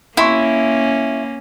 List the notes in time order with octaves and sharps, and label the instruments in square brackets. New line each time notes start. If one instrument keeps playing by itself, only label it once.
[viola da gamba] A#3 C#4 [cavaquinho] E4 [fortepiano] E5 C6 C#6